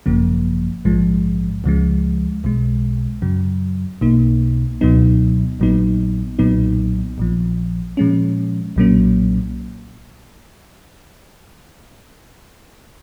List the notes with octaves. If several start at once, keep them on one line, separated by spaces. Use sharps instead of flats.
G#1 F#2 C#3 F3 A#3
A#1 G#2 F3 G#3
C#2 C#3 F3 G#3
B1 B2 G#3
F#2 C#3 F#3
B1 B2 A#3 D#4
C#2 B2 F#3 B3 D#4
A#1 A#2 F#3 B3 D#4
B1 A#2 F#3 B3 D#4
A#1 A#2 F3
A#2 F3 G#3 C#4
B1 A#2 F#3 A#3 C#4